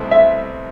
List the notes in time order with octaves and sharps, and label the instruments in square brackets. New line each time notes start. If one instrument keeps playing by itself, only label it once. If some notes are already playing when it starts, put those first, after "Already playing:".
Already playing: [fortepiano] C2 B2 A3 C4 E4
[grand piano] E5